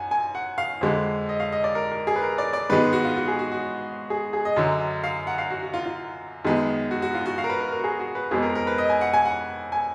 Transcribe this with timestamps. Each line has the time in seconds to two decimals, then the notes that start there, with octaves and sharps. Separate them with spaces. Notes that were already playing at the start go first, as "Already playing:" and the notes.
Already playing: F#2 F#5 G#5
0.11 G#5
0.35 F#5
0.58 F5
0.81 F2 D3 G#3
1.29 D#5
1.40 F5
1.52 D#5
1.64 D5
1.75 A#4
1.92 A#4
2.07 G#4
2.16 B4
2.22 A#4
2.38 D5
2.53 D5
2.70 G#2 D#3 G#3 B3 B4
2.93 F#4
3.05 F4
3.16 F#4
3.28 G#4
3.39 F#4
3.52 F#4
4.10 G#4
4.33 G#4
4.45 D#5
4.56 F#2 D3 F#3
5.04 F5
5.27 F#5
5.38 F5
5.50 F#4
5.63 F#4
5.74 F4
5.85 F4
6.44 F#2 D#3 G#3 B3
6.91 F#4
7.02 F#4
7.14 F4
7.26 F#4
7.38 F5
7.44 A#4
7.50 B4
7.60 A#4
7.72 A#4
7.80 F#4
7.84 G#4
8.00 F#4
8.15 B4
8.31 F2 F3 G#3 B3 G#4
8.42 A#4
8.55 A#4
8.67 B4
8.78 D#5
8.89 G#5
9.01 F#5
9.13 G#5
9.26 F#5
9.72 G#5